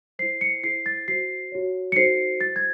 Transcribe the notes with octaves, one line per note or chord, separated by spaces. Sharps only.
E4 C5 C7
C#7
E4 G#4 C5 C7
A6
F#4 C5 C7
F#4 C#5
C#7
D#4 F#4 A4 C5 C7
E4 C5 A6
G#6